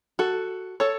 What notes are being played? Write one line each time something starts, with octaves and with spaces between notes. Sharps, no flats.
F#4 A4
A4 C#5